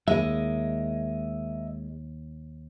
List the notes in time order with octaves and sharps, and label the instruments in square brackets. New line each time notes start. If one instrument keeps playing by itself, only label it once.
[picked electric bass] D#2 [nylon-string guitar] G#3 [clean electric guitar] A#4 D#5 E5